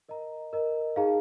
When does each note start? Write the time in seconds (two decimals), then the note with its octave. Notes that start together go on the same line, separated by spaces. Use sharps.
0.09 A#4 D#5 A#5
0.53 A#4 D#5 A#5
0.96 D#4 G#4 F5 A#5